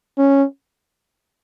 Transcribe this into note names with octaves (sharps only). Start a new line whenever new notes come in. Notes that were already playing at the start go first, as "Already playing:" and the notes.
C#4